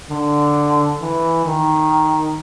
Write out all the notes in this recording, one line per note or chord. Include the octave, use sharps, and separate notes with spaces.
D3
E3
D#3